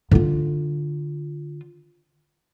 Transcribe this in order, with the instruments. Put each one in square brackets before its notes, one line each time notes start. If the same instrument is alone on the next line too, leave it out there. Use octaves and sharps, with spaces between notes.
[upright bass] D3 F4